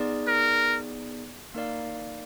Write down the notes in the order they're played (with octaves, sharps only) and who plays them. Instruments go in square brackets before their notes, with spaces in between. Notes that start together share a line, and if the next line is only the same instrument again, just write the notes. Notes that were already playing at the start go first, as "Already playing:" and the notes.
Already playing: [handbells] B3 D#4 G#4 D5
[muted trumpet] A#4
[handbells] A#3 D#4 A#4 D5 F5